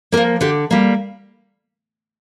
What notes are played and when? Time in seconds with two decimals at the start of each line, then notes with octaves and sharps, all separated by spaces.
0.12 A#3 A#4
0.17 F3
0.41 D3 G4
0.71 G3 A#3